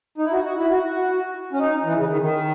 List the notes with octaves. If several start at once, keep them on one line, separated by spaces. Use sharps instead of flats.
D#4
E4
F#4
F#4
E4
F#4
F#4
C#4
D#4
E3
C#3
D#3
D#3